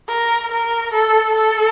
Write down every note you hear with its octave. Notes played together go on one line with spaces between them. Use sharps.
A#4
A#4
A4
A4